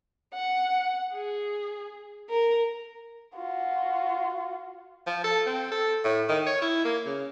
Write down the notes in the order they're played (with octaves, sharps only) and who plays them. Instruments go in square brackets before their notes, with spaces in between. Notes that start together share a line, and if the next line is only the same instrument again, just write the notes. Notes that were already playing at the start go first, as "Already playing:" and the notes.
[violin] F#5
G#4
A#4
[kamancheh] F4 F#4
[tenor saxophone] F3
A4
C4
A4
A2
D#3
C#5
E4
A#3
C#3